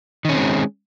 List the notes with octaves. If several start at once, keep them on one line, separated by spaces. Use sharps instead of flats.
D#3 G#3 C4 C#4